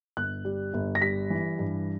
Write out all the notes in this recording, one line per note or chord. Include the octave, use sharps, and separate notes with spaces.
G1 F#6
G3
G1
A#6
G3 B6
E3
G2